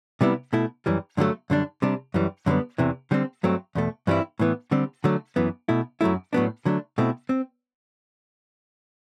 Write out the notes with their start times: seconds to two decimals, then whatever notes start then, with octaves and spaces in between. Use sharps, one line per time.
0.21 C3 G3 B3 E4
0.53 B2 A3 E4
0.86 F#2 E3 G3
1.17 G2 D3 F#3 A3
1.50 F#2 D3 G3 D4
1.82 C3 G3 D4
2.14 F#2 E3 G3
2.46 F#2 D3 G3 B3
2.78 E2 C3 E3
3.11 D3 G3 C4
3.43 G2 F#3 A3 C4
3.75 E2 B2 A3
4.07 G2 E3 G3 C4 E4
4.39 A2 E3 B3
4.71 D3 G3 C4
5.04 D3 F#3 A3
5.36 F#2 E3 B3
5.69 B2 A3 E4
6.01 F#2 F#3 A3 E4
6.33 A2 F#3 B3 D4
6.65 D3 F#3 A3 D4
6.98 B2 A3 C4 E4
7.29 C4